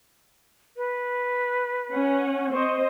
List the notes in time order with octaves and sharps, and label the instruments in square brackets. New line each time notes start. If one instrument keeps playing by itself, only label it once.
[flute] B4
[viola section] C#4 F#5
[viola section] C4 C5 D#5 [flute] C#6